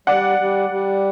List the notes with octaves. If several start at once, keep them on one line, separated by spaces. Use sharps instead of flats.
G3 D5 F#5
G3
G3